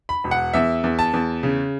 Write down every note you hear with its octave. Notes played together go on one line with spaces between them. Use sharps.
B5
E1
F#5
E2 E5
E2
A5
E2
C#3